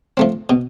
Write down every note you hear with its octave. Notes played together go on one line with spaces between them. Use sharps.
F3 A3 C4
B2